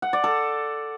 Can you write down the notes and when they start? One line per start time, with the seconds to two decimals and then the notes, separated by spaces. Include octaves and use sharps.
0.02 F#5
0.13 D5
0.24 A4